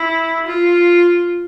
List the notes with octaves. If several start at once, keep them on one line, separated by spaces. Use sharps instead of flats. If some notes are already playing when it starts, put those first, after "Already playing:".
Already playing: E4
F4